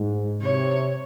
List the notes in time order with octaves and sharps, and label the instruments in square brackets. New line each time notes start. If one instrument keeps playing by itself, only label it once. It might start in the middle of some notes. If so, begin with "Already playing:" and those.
Already playing: [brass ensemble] G#2
[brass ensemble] C3 [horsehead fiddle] C#5